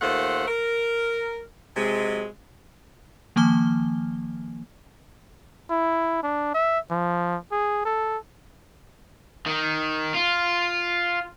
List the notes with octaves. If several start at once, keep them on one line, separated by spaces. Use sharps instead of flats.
D#2 A3 F4 C5 F#5
A#4
C3 F#3 G#3
D#3 F3 A#3 G#5 F6 G7
E4
D4
E5
F3
G#4
A4
D#3
F4